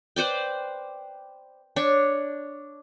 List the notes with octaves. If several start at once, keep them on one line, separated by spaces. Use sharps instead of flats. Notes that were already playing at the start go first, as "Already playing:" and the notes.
B4 C5 D5 G5
D4 C#5